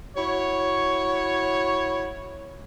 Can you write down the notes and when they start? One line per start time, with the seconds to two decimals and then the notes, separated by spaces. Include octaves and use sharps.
0.17 E4 F#4 C#5